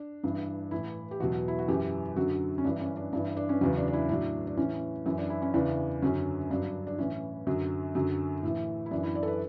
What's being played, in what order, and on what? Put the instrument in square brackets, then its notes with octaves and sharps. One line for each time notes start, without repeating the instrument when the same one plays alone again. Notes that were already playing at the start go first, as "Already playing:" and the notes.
Already playing: [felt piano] D4
G2 E3
A2 E3 E4
G4
E2 B2 F#3 F#4
E4
F#4
F#2 E3 G4
F#2 D3 F#3 F#4
C#4
G2 E3 D4
C#4
D4
G2 E3 D4
D4
C#4
E2 C#3 F#3 C#4
D4
D4
E4
A2 F#3 D4
D4
A2 E3 C#4
F#2 E3 C#4
D4
E4
C#4
E2 C#3 E3 D4
F#2 D3 F#3 C#4
G2 F#3 D4
D4
A2 E3 C#4
F#2 D3 F#3
F#2 D3 F#3
A2 E3
E4
F#2 E3 D4
E4
D5
A4
B4